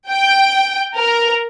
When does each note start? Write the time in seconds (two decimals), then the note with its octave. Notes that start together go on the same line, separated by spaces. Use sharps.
0.10 G5
0.95 A#4